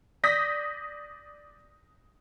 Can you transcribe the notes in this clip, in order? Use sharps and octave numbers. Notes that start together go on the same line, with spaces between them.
D5 D#6 G6 A#6 B6